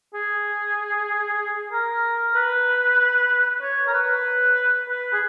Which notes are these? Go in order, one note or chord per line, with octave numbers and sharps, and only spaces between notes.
G#4
A#4
B4
C#5
A#4
B4
B4
G#4